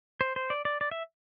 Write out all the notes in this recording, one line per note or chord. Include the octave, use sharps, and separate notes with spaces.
C5
C5
D5
D5
D5
E5